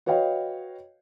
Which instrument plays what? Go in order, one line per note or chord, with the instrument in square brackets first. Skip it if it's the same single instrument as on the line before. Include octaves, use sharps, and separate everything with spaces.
[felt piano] F#4 B4 C#5 D#5 F5 G5